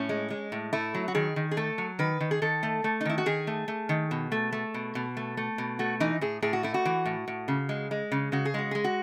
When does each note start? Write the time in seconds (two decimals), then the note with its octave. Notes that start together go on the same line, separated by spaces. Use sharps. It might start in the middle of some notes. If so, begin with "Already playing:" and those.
Already playing: A2 C#4
0.09 G#3
0.30 G#3
0.52 A2
0.73 A3 E4
0.94 F#3
1.08 F#4
1.15 D#3 G#4
1.36 D#3
1.51 G#4
1.57 A3 A4
1.78 F#3
1.99 D#3 B4
2.20 D#3
2.31 G#4
2.42 D#3 A4
2.63 A3
2.84 A3
3.01 D#4
3.05 D#3 E4
3.18 F#4
3.26 D#3 G#4
3.47 A3
3.68 A3
3.89 D#3
4.11 B2
4.32 A3
4.52 A3
4.74 B2
4.95 B2
5.17 A3
5.37 A3
5.58 B2
5.79 A3 F#4
6.00 E3 D#4
6.21 A2 G#4
6.42 A2 G#4
6.53 F#4
6.63 A3 E4
6.74 F#4
6.85 E3
7.05 A2
7.28 A2
7.48 C#3
7.69 G#3
7.91 G#3
8.12 C#3
8.32 C#3 F#4
8.45 G#4
8.54 G#3 F#4
8.71 G#3 G#4
8.84 F#4